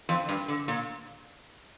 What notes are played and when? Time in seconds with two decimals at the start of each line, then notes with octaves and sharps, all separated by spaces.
0.09 F2
0.29 G2
0.48 D3
0.68 A#2